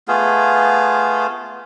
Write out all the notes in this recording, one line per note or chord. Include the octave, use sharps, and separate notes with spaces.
A3 B3 F4 G#4